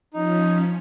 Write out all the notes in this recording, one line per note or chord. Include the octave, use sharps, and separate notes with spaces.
F3 C#4 D#4